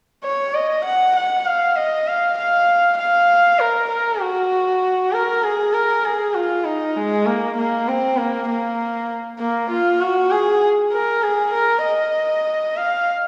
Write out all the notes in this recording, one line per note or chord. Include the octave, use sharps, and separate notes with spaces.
C#5
D#5
F#5
F#5
F5
D#5
F5
F5
F5
A#4
A#4
F#4
A#4
G#4
A#4
G#4
F4
D#4
G#3
A#3
A#3
C4
A#3
A#3
A#3
F4
F#4
G#4
A#4
G#4
A#4
D#5
F5